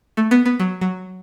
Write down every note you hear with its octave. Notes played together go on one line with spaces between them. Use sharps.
A3
B3
B3
F#3
F#3